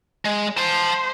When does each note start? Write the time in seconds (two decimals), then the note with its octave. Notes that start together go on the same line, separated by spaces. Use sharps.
0.25 G#3
0.57 C5 A5 C6